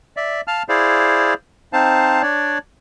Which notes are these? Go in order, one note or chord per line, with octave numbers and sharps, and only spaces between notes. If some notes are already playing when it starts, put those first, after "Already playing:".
D5 E5
F5 A5 F6
E4 G#4 C5 D5 F5
C4 D#4 C5 F5 A5
D4 C#5 D5